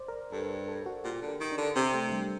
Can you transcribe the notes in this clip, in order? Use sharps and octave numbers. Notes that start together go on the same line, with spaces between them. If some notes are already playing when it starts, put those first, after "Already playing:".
Already playing: C5 D5
A#4
G2 A4
A4
F#4
A#2 G4
D3
A#4
D#3
D4
D3
C3 C4
A3
G3